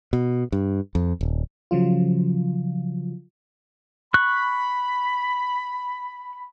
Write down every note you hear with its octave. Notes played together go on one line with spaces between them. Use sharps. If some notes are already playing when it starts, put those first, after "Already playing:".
B2
G2
F2
D#1
C#3 F3 F#3 F4
B5 C#6 F#6